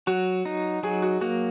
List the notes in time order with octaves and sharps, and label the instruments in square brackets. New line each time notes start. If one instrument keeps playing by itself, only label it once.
[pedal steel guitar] F#3 [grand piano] F#4
[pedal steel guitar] D#4
[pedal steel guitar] F#3 [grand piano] G#4
[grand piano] F#4
[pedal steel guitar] A#3 [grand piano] F#4